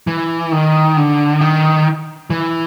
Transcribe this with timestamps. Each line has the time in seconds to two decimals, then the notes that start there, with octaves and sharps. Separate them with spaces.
0.07 E3
0.52 D#3
0.97 D3
1.41 D#3
2.30 E3